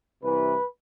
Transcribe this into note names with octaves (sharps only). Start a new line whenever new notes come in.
C2 C3 E3 B4